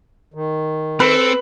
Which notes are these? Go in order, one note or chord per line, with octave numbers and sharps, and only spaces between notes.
D#3
C4 A4 B4